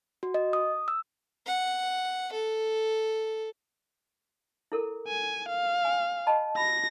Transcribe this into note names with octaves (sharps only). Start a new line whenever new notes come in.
F#4
D#5
D#6
E6
F#5
A4
E4 A4 A#4
G#5
F5
G#5
D#5 A5 B5
B5 A#6